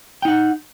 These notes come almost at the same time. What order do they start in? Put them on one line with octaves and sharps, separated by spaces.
G5 D#4 F#5